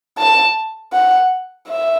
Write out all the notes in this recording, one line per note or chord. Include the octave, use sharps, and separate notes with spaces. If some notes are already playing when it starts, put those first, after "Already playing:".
A5
F#5
E5